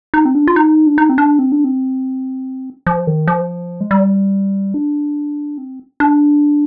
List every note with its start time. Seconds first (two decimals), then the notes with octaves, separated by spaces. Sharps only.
0.14 D#4
0.25 C4
0.35 D4
0.48 F4
0.56 D#4
0.87 D4
0.98 D#4
1.09 C4
1.18 D4
1.39 C4
1.52 D4
1.64 C4
2.87 F3
3.07 D#3
3.28 F3
3.81 G#3
3.91 G3
4.74 D4
5.58 C4
6.00 D4